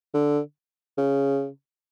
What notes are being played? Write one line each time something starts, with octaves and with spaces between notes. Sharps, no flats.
D3
C#3